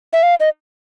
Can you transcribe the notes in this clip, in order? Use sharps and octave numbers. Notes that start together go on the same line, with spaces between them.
E5
F5
D#5